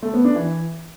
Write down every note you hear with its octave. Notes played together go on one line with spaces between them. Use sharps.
A3
B3
D4
E3